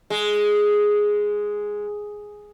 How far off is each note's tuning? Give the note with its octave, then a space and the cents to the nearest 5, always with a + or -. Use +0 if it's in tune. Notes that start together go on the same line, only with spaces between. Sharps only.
G#3 +0